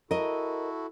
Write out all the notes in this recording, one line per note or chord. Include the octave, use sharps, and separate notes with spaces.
E4 F#4 A4 A#4 D#5